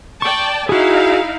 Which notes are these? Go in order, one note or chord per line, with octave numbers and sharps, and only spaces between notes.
D5 G5 A5 C#6
D#4 E4 F#4 G#4 F5